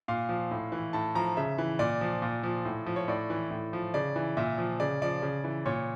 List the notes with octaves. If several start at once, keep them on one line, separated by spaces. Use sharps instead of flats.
A#2 F5
F3
A2
E3
A2 A5
F3 A#5
C#3 E5
E3
A#2 D5
F3
A#2
F3
A2
F3
C#5
A2 D5
E3
A2
F3
C#3 D5
E3
A#2 E5
F3
C#3 D5
F3 D5
C#3
E3
A#2 C#5